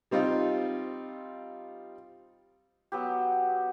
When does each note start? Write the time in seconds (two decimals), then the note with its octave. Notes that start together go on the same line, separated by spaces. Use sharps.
0.11 G3 C4 D#4 F4
2.92 F#3 B3 G4